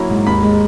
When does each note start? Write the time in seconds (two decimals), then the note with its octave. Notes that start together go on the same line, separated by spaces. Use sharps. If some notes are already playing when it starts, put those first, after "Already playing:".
Already playing: F#3 A#3 C#4 E4 A#5
0.10 G#2
0.27 D#2 B5
0.43 G#3